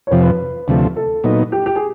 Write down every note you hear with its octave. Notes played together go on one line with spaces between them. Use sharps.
C#5
F2 C3 F3 C5
B4
B4
D2 C3 F3 A3
A4
A#2 F#3 B3 D#4
G4
G4
G#4